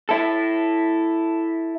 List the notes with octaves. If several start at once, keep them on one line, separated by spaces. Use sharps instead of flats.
E4 A4